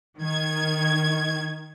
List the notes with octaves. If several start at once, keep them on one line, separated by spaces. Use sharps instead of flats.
D#3 G#6